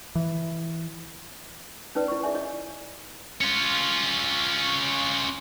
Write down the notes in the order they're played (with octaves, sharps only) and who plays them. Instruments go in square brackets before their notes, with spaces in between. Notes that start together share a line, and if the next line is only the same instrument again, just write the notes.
[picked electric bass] E3
[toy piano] C#4 D#4 B4 D5
E4 D5 C#6
G#4 D5 E5 G#5
E4 C#5 D#5
[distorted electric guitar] C#4 F4